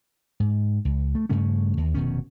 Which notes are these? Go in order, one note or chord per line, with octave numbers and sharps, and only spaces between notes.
G#2
C#2
A3
G2 C#3 A3 C#4
D#2
F1 B2 D#3 C#4